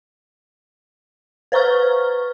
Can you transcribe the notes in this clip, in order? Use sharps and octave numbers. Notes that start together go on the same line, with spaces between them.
B4 C5 A#5 C#6 F6